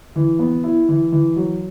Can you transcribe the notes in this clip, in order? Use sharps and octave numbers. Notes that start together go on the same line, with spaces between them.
E3
B3
E4
E3
E3
F#3